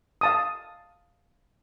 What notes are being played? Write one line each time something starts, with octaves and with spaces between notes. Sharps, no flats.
F5 A5 D#6